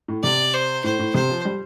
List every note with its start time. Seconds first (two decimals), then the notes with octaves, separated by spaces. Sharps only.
0.08 A2
0.23 C3 D5
0.54 C5
0.84 A2 C5
0.99 A2
1.14 C3 C5
1.30 F3
1.45 G3